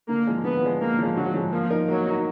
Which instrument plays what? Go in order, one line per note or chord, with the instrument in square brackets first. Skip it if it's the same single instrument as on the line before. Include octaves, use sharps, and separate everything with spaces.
[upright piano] D3 [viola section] A#3
[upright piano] F3 G#3
[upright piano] D3 [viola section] B3
[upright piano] F3 G#3
[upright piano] D3 [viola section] A#3
[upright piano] F3 G#3
[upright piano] D3 [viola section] F#3
[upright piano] F3 G#3
[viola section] F3 [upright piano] A#3
[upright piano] D#4 A#4
[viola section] F#3 [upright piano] A#3
[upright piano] D#4 A#4